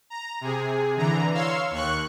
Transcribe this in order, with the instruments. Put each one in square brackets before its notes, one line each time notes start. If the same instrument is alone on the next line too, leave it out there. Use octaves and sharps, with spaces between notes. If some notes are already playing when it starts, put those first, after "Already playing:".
[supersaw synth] A#5
C3 G#4
D3 E3 A#5
C#5 F5 C6 E6
D#2 C#6 F#6